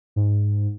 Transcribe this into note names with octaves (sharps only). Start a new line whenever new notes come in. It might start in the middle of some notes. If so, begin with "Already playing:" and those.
G#2